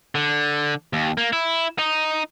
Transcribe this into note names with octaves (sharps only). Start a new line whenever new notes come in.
D3
D#2
A#3
E4
D#4